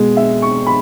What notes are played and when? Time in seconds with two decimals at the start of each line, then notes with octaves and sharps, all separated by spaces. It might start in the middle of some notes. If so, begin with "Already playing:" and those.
Already playing: B2 G#3
0.17 E5
0.42 C#6
0.67 B5